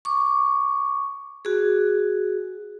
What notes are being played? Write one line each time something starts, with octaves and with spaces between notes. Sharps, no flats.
C#6 D6
F#4 G#4